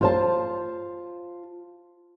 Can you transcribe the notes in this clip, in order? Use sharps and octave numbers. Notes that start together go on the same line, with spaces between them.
F4 C5 A5